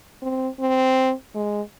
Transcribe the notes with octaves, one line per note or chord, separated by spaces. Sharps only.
C4
C4
G#3